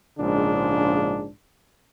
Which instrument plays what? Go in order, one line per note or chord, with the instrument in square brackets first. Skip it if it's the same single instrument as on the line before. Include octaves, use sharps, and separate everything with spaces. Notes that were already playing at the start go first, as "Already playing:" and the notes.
[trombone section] A#1 G#2 C#3 G#3 D4